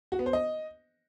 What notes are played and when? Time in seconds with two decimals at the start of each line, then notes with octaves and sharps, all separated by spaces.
0.12 F#4
0.19 B3
0.26 C5
0.33 D#5